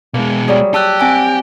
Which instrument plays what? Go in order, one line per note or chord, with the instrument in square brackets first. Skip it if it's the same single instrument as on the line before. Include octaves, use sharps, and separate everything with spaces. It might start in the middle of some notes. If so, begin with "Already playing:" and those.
[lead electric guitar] B2 G#3 [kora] A#3
[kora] F#3 G3 G#4
[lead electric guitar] G4 [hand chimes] A5 E6 F#6
[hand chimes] C4 G#5 D7